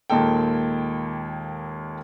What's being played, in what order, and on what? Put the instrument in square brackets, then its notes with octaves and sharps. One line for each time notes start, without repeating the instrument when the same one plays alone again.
[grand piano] D#2 A#2 G#3 A#3 A4 G5